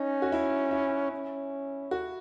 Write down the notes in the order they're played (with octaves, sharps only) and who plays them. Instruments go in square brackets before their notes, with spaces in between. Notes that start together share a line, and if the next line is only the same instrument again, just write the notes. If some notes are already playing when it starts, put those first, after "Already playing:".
Already playing: [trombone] C#4 [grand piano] D#4
[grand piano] F#4
E4
E4
[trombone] C#4
[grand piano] F#4